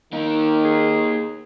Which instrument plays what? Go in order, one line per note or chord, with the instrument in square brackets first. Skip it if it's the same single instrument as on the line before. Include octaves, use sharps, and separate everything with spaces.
[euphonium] D#3 [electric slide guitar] A#3 D#4
[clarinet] G#4